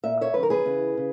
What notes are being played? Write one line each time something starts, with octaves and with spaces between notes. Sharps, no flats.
A#2 E5
C#5 E5
F#2 D#3 B4
A#4
G#4 B4
E2 C#3 E3
C#3